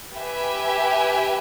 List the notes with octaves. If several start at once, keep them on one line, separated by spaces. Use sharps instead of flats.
G4 B4 E5 G#5